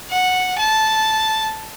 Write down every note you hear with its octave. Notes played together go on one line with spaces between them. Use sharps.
F#5
A5